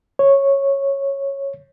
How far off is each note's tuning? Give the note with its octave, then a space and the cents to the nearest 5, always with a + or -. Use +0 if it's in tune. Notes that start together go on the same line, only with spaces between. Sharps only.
C#5 -10